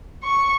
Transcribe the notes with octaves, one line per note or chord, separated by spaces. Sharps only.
C#6